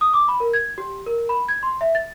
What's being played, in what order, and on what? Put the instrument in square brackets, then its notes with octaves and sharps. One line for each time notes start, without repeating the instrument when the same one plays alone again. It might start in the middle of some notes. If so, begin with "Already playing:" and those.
[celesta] D#6
D6
B5
A#4
G#6
G4
A#4
B5
G#6
C6
E5
A6